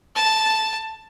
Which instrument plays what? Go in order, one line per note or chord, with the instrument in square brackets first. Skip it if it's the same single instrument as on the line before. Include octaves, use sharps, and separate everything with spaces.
[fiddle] A5